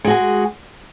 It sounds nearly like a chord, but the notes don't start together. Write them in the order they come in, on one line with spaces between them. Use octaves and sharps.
G#3 F#4 G#4